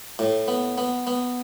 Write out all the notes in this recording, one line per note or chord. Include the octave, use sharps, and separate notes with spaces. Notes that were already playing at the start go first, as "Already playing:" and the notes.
A2
B3
B3
B3